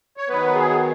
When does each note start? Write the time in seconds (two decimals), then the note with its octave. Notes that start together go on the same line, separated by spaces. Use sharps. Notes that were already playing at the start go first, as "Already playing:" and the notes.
0.17 C#5
0.29 D#3 F#3 B3 B4
0.55 G#4